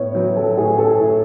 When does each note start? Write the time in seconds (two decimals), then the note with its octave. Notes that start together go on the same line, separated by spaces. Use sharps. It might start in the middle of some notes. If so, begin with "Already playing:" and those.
Already playing: A2 B3 C#5
0.15 F#3 B4
0.37 A4
0.57 A2 G#4
0.78 A4
0.99 A2